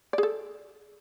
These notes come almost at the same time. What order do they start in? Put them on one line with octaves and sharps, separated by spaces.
D5 G#4 A4